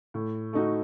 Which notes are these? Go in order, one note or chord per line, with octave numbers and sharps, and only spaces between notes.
A2
A3 D#4 F#4